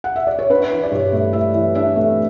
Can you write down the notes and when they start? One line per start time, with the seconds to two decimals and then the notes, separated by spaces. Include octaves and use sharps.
0.04 F#5
0.16 E5
0.27 D5
0.39 C#5
0.50 D4 B4
0.71 E3
0.84 D5
0.92 G2 C#5
1.13 A3
1.33 E3 E5
1.54 E3
1.75 D4 E5
1.96 A3